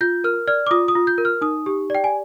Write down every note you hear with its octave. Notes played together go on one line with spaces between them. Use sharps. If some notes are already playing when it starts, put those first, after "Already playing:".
F4 G6
A#4 F6
D5 F6
D6
F4 D#6
D#6
F4
G6
A#4
F6
D#4 D#6
G4
D5 G5
G#5